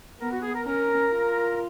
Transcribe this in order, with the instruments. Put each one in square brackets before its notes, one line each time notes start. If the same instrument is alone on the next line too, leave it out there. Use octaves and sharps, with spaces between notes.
[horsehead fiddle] B3 [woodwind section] A#4
[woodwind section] F#4
G#4
A#4
[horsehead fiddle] C#4 [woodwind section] A#4
[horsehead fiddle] F4